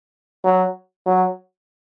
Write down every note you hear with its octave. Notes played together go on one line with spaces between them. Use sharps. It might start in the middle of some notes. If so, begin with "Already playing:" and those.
F#3
F#3